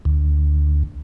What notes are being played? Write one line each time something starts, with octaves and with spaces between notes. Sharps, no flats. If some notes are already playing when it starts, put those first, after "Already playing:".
D2